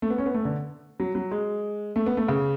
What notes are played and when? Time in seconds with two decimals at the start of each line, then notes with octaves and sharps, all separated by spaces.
0.02 A3
0.10 B3
0.18 C#4
0.26 B3
0.34 A3
0.45 D3
1.00 F#3
1.15 F#3
1.31 G#3
1.96 A3
2.06 B3
2.17 A3
2.28 C#3